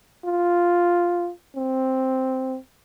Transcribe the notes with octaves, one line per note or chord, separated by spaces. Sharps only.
F4
C4